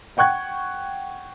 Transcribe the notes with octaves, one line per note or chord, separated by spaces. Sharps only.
F#5 G5 C#6 F#6 G#6